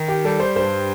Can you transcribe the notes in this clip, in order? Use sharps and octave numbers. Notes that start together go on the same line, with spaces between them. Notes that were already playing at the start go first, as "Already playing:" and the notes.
Already playing: D#3
G4
G3 A4
C5
G2 C5